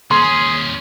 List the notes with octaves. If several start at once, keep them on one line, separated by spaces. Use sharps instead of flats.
D#2 C#4 G#4 C6